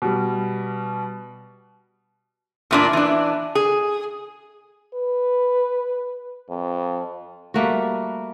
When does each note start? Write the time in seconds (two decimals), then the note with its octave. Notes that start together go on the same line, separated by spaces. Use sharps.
0.02 B2 G3
2.71 E2 A#2 D4
2.93 E3 D4
3.55 G#4
4.94 B4
6.50 F2
7.54 G3 A3 A#3 F#4